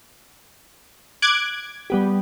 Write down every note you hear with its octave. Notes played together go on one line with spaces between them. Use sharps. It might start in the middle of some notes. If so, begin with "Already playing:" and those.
D6 F#6 G#6
G3 B3 G4